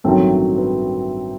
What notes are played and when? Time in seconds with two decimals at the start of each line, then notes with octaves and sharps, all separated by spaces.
0.04 A1 G2 D#3 F#3 A3 C4
0.58 B4